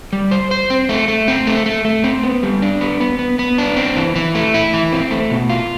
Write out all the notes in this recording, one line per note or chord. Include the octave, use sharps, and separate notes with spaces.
G3
C5
C5
C4
A3
A3
C4
A3
A3
A3
C4
B3
G3
D4
B3
B3
B3
B3
D4
C4
E3
E3
A3
E4
E3
C4
A3
B2
F4